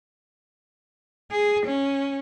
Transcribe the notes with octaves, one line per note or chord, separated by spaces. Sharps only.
G#4
C#4